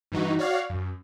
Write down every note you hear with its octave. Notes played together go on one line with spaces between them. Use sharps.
G2 E3 D#4 F#4
F#4 C#5 D5 F5 F#5
F#2